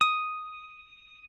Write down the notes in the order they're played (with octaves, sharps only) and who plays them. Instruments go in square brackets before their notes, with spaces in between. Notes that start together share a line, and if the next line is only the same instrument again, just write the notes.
[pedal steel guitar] D#6